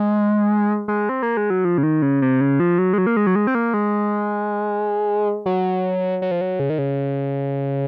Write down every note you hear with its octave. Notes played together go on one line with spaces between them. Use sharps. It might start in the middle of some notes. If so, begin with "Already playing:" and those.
Already playing: G#3
G#3
C4
A#3
G#3
F#3
F3
C#3
D#3
C#3
C3
C#3
F3
F#3
G#3
F#3
A#3
G#3
F#3
G#3
C4
A#3
G#3
F#3
F#3
F3
F#3
C#3
D#3
C#3